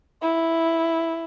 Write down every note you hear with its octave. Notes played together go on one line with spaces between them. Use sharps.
E4